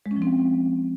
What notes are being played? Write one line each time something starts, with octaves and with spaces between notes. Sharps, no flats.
G#3
C#4
F3
C4